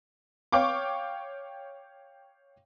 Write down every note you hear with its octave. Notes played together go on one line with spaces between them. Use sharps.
C#5 F5 G5 C#6 D6